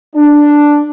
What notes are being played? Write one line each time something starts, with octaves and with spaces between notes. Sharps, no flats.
D4